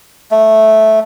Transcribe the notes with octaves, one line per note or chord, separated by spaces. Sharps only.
A3